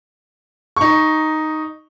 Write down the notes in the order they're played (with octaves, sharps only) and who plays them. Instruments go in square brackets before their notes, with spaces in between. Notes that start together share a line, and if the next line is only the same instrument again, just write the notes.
[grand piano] D#4 C#6